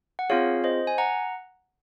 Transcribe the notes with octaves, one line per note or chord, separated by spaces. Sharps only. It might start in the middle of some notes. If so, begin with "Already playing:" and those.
F#5
C4 F4 G#4 C#5 F5
C5 D#5
G#5
F#5 A#5